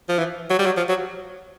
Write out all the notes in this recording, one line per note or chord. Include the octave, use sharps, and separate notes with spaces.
F3
E3
F#3
G3
F#3
F3
F#3